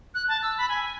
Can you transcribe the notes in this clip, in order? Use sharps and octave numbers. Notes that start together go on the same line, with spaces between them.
F#6
A5
E6
B5
G#5
G#5